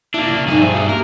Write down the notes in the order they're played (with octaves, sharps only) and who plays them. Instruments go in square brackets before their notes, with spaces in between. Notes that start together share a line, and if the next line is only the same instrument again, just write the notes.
[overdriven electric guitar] A#3 D4 [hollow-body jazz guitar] E4 F4
[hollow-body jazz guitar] C#3
[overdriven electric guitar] G2 G#4 [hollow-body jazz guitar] F3 F#3 D#4
[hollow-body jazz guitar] C5 E5 F5
F#4 E5
[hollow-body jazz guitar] A#3 G4 [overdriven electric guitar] A#4